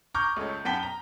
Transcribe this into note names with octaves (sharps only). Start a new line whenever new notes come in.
A#5 C#6 D6 F6 G6
C#2 A3 C#5
F#2 B3 G5 A5 B6 G7
A#5